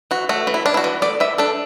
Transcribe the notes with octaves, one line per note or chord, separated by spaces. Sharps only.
E3 F#4
A3 F#4
E3
E4
D4
E4
F#4
E3
A3 D5
E3 E5
D4 A4